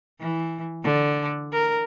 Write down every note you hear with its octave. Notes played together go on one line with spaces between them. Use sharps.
E3
D3
A#4